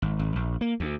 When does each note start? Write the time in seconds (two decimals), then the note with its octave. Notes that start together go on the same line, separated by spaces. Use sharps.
0.02 G#1
0.19 G#1
0.36 A#1
0.61 A#3
0.80 D2